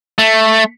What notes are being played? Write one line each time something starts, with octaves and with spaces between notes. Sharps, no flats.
A3